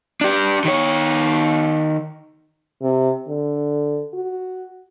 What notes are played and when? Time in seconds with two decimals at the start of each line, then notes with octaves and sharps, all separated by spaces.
0.21 D4 G4
0.64 D#3 C#5
2.82 C3
3.28 D3
4.13 F#4